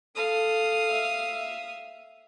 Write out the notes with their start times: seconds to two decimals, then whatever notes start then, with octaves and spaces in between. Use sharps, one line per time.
0.16 A4 F5 D#6
0.92 E5